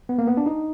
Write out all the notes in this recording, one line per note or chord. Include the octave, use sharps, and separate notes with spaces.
B3
A#3
B3
D4
D#4